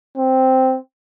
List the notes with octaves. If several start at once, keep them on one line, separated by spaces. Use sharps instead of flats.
C4